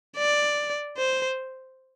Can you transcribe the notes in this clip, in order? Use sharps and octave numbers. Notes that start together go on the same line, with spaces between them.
D5
C5